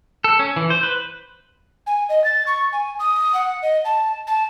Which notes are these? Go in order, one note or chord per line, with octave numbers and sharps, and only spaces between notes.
A4
C#4
E3
C5
B4
G#5
D#5
A6
C#6
G#5
D#6
F#5
D#5
A5
A5